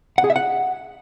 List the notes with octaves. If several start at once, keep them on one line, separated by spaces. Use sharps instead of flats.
F#5
G#4
E5
F#5